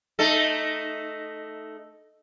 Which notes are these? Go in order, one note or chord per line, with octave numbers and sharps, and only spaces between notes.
A3 D#4 A4